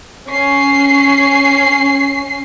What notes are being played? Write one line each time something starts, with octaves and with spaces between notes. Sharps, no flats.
C#4 C7